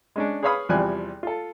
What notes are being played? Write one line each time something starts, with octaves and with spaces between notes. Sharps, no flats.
G#3 C#4 D4
G#4 B4 C#5 F5 B5 D#6
E2 C3 F3 G3 G#5 F#6
F4 A4